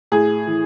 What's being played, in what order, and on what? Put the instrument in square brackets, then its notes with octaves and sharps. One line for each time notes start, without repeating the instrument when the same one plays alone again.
[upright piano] A2 G#4
E3